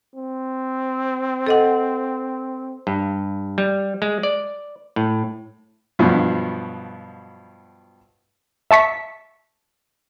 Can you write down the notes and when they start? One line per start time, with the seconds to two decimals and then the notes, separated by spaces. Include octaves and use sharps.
0.15 C4
1.47 A4 D#5 F#5
2.87 G2
3.58 G3
4.02 G#3
4.23 D5
4.96 A2
5.99 G2 B2 F3 F#3
8.71 E5 A5 C#6 B6